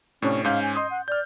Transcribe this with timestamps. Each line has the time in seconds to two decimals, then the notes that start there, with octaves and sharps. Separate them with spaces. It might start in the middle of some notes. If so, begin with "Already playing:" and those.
0.22 A2 C3 C#4 D4
0.45 G#2 C#4 F5 G6
0.63 G#5
0.76 D#5 C6 D#6
0.91 F#5
1.08 D5 F6 G6